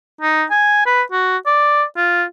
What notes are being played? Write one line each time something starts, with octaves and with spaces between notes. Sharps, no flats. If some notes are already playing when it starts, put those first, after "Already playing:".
D#4
G#5
B4
F#4
D5
F4